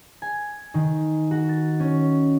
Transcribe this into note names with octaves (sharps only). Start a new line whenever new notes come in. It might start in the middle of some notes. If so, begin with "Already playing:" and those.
G#5
D#3
F#4
A6
C#4